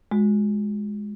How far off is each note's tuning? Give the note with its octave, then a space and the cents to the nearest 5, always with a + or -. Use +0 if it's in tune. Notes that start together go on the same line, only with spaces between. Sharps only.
G#3 +0 F#4 -30